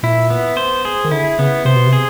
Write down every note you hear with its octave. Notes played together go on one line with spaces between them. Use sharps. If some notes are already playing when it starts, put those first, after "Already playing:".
A#2 E4
B3
C5
G#4
D#3
D3 E4
C#3 B3
C3 C5
B2
C3
G#4